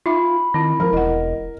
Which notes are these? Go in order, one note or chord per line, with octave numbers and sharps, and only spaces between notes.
D#4 F4 E5 B5 D6
D#3 C4 E4
F3 A#4
E1 E4 D#5 F#5